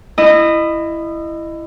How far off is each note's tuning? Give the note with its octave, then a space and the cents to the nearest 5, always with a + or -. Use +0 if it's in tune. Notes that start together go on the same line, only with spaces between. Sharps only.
E4 +10 D#5 -20